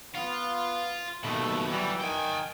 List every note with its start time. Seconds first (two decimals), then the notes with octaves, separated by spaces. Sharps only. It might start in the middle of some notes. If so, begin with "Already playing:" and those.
0.15 B3 F4
1.24 D#2 B2 A3
1.69 F#2 E3 G3
2.01 D#3 G5 G#5